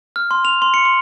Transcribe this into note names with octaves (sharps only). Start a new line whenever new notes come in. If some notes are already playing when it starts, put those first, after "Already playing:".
F6
C6
F7
C6
C#7
C6